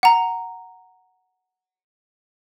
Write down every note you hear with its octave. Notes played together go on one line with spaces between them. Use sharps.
F#5 A#5